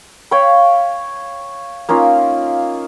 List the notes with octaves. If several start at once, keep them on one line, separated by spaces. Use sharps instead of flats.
C#5 F5 G5 B5
A#3 C#4 D#4 F4